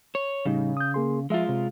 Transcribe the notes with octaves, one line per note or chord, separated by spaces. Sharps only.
C#5
A2 C#3 G3 D#4
D#6 G6
A#3 G#4 C6
F3 G#3 F4 E5
C3